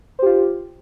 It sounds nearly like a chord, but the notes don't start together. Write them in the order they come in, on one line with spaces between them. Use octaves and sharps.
C5 G4 F4